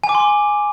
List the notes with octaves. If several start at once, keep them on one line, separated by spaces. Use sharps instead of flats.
G#5
D6
C6
G#5